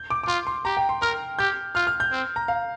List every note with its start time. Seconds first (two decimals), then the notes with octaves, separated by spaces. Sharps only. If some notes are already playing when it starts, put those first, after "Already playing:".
Already playing: G6
0.10 D6
0.23 D6
0.28 F4 C6
0.47 C6
0.65 G4 A#5
0.77 G5
0.89 C6
1.02 A#4 F6
1.39 G4 G6
1.75 F4 F6
1.87 F6
2.00 G6
2.12 C4
2.36 A#5
2.48 F5